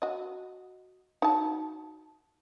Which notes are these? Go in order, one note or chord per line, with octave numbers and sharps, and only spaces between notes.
F#4 D#5
D#4 F#4 A5